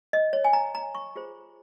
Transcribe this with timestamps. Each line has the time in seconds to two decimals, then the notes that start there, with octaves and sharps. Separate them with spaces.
0.13 D#5
0.33 C#5
0.44 G#5
0.53 A#5
0.75 A#5
0.95 C#6
1.16 F4 G#4 C5